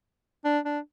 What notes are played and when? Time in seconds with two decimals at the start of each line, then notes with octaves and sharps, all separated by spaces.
0.45 D4
0.65 D4